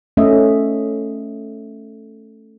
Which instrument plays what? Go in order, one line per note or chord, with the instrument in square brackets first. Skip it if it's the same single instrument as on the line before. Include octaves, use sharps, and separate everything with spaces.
[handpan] A3 C#4 D#5 E5